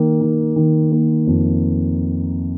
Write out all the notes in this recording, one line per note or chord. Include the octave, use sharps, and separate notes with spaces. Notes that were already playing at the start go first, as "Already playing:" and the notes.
Already playing: D#3 A#3
D#3
D#3
A#3
F2